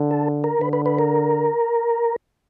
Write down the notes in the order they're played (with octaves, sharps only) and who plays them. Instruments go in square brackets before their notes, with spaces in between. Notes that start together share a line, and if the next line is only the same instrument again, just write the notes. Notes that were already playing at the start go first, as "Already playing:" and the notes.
Already playing: [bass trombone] D3
[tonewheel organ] A4
A#4
[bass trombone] D3 [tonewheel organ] B4
[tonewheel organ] B4
B4
A#4